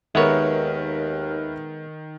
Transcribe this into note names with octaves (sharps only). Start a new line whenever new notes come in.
D#2 D#3 G#3 B3 A#4 B4 C#5 E5